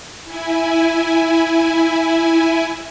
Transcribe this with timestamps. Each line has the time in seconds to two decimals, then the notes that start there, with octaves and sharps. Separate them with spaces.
0.24 E4 G#5